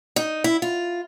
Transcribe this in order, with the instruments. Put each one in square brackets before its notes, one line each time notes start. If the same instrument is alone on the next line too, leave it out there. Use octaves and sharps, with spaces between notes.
[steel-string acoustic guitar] D#4
E4
F4